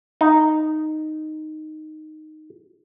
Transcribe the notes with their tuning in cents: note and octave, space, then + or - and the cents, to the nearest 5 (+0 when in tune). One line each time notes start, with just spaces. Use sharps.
D#4 -5